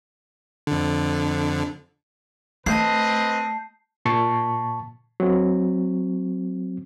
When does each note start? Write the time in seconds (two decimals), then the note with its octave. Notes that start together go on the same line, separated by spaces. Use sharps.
0.67 F2 D3
2.66 A3 C4 B4 D#5 A5 G6 C7
4.05 A#2 A5 C#6
5.20 F#3 C4